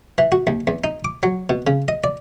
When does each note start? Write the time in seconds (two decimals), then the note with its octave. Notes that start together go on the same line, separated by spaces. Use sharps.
0.18 E3
0.32 F#4
0.47 D#2
0.67 E2
0.84 D#4
1.05 D6
1.23 F#3
1.50 B2
1.67 C#3
1.88 D#5
2.04 D5